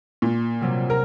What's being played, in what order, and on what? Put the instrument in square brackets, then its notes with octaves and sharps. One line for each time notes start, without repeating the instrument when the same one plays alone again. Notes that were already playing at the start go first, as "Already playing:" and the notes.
[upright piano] A#2
[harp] C3 F#3 G3
[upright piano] A#4 [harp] A#5 F6